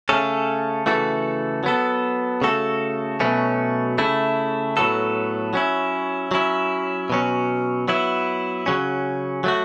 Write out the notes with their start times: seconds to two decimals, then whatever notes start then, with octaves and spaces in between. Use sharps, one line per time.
0.09 C#3 A3 C#4 A4
0.86 C#3 E3 A3 F#4 A4
1.64 F#3 B3 A4
2.42 C#3 A3 F#4 A4
3.20 B2 F#3 A3 C#4
3.98 C#3 A3 E4
4.77 A2 F#3 B3 A4
5.53 F#3 C#4 E4
6.31 F#3 C#4 E4
7.10 B2 F#3 C#4
7.88 F#3 B3 E4
8.66 C#3 F#3 C#4
9.44 F#3 A3 F#4